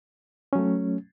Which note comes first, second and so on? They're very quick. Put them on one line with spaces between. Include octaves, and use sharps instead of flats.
C#4 F#3 A3